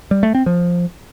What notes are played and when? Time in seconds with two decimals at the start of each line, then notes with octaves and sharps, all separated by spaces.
0.11 G3
0.23 A3
0.35 C4
0.46 F3